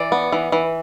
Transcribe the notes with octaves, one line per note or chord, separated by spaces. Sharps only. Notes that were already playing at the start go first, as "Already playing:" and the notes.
Already playing: E3 D5
B3
E3
E3